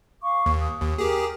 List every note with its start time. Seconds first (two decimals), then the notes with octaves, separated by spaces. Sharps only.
0.22 F5 C#6 D6
0.46 D#2
0.58 D#6
0.81 D#2
0.98 G4 G#4 A#4 G5